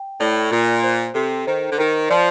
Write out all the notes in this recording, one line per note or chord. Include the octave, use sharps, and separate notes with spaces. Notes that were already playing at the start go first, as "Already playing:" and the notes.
Already playing: G5
A2 D5
A#2 F4
C5
C3 A4
D#3 C5
D3
D#3 A#4
F3 D5